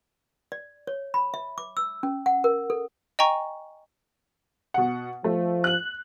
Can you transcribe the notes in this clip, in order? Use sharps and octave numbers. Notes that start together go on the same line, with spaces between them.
D5
C#5
B5
E5
D6
E6
C#4
F#5
A#4
A4
D#5 G5 G#5 A#5 C#6
B2 F#5
F3 A3
F#6 F#7